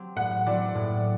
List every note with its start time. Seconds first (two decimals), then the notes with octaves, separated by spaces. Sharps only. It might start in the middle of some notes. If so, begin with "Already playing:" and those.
Already playing: F#3 C4 G4
0.16 A2 F#5
0.46 F#3 C4 E4 D5
0.75 A2